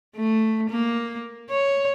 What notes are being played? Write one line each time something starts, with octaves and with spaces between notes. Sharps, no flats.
A3
A#3
C#5